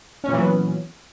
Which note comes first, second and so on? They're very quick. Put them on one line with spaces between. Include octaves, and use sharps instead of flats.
C#4 A#2 E3 F#3 B3